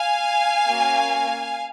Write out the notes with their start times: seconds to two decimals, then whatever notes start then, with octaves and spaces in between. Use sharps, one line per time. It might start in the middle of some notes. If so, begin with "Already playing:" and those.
Already playing: F5 G#5
0.67 A#3 C#4 F#4